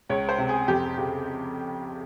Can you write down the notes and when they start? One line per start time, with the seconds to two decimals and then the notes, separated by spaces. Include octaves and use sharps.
0.09 C#2 C#5
0.29 C5
0.38 C3
0.49 G#4
0.68 F2 G4
0.98 C#3 G4